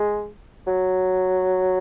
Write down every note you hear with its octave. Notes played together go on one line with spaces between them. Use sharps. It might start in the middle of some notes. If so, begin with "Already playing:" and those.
Already playing: G#3
F#3